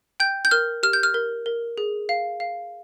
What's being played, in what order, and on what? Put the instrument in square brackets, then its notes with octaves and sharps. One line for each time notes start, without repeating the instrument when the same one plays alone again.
[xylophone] G5 G6
G6
A#4 F6
G4 F6
G6
F6
A#4
A#4
G#4
F5
F5